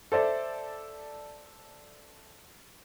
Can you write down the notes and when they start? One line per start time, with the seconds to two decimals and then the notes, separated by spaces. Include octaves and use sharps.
0.12 A4 C5 D5 E5